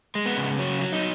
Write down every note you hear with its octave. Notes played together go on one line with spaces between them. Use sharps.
G#3
B3
C#3
F#3 C#4
F#3
D#4